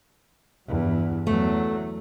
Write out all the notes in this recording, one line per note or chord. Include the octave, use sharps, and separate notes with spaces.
E2 G2
E2 F#3 A3